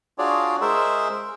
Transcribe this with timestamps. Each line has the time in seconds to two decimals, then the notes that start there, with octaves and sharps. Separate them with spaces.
0.18 D4 F4 F#4 G#4 C#5 D5
0.61 G#3 G#4 A#4 C5 E5 E6